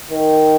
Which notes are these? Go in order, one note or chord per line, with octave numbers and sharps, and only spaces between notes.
D#3